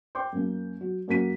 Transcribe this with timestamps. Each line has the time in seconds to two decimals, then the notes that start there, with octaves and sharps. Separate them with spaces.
0.15 G5 C6 D6 G6
0.33 F#2 A#3
0.81 F#3
1.08 F#2 A#3 F#4 B6 D#7